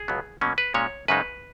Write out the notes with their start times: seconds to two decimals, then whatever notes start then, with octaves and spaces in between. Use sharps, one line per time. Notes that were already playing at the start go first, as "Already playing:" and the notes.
Already playing: G#4
0.08 C#2 B2 F#3 B3
0.41 B2 F#3 A#3 C#4
0.58 B4
0.74 A#2 G#3 C#4 C#5
1.08 F#2 C#3 G#3 D#4 B4